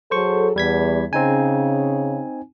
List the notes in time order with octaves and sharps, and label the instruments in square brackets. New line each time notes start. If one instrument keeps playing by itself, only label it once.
[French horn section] F#3 G#4 A4 [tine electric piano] C5 C#6
[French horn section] E2 [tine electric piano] G3 G#6 B6
[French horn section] C#3 [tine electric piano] C4 D#4 G#5